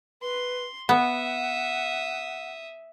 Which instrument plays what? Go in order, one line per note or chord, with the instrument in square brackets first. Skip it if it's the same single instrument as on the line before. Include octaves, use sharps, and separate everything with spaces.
[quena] B4 [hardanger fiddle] C6
[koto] B3 [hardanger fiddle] E5 D#6 [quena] F#5